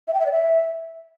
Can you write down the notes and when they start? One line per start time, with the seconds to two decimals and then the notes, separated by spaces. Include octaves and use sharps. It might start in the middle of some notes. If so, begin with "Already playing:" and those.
0.07 E5
0.13 G5
0.19 E5
0.25 D5
0.31 E5